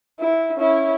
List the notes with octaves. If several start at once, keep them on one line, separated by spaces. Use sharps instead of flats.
E4
C#4 E4